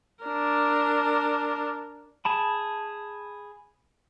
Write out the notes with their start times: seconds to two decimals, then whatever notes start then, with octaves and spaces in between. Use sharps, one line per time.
0.24 D4 A#4
2.25 G#4 A5 B5